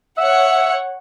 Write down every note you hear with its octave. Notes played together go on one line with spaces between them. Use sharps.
C#5 E5 F#5